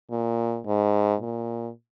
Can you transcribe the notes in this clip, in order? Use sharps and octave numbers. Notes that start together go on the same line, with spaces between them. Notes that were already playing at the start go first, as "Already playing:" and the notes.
A#2
G#2
A#2